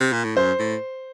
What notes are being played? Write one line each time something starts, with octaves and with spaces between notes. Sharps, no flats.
C3
A#2
A2
F#2 C5
A2